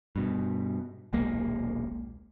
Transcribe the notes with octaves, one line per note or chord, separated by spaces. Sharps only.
G2 B2
D#1 B1 G#3 A#3